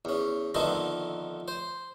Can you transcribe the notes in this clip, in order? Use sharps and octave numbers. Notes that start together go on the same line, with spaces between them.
E2 C#4
F2 D3 D#3 A3 B3 C4
C5